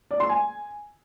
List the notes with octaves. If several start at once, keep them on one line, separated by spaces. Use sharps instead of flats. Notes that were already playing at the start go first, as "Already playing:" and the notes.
D5
C6
G#5